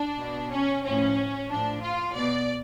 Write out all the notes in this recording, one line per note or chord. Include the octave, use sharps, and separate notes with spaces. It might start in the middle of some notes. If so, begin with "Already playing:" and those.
Already playing: D4
B2
C#4
A2 F3 C#4
A2 F3 D4
F4
B2 D5